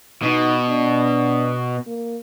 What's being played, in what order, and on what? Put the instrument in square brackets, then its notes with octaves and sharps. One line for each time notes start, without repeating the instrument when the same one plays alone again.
[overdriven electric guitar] B2 [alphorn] D#4
[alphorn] D4
A#3